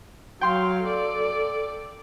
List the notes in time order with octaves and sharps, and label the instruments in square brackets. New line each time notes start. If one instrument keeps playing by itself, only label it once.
[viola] F#3 F5 [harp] G5 C6
[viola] A4 D5